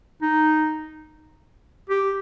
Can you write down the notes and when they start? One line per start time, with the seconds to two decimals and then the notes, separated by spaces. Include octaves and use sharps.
0.22 D#4
1.90 G4